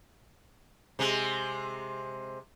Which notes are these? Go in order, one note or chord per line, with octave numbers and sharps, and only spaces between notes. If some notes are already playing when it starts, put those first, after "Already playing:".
C3 G#3